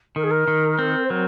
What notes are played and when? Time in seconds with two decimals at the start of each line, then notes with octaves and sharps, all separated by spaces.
0.16 D#3 A#4
0.24 G#4
0.31 A#4
0.48 D#3
0.79 C4
1.04 C5
1.10 F#3 A#4